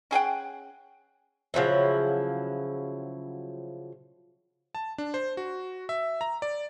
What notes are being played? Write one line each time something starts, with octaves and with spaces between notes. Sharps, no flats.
C#4 G#4 F#5 G5
C#3 F3 F#3 E4
A5
D4
C5
F#4
E5
A#5
D5